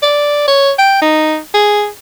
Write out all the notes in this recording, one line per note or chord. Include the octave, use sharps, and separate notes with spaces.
D5
C#5
G5
D#4
G#4